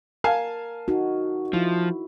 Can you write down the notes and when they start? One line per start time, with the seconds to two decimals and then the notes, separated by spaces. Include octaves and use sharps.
0.24 A#4 F5 G#5 A5
0.88 D#4 F#4
1.53 F3 E4